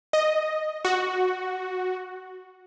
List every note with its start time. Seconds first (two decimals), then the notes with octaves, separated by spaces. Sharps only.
0.13 D#5
0.85 F#4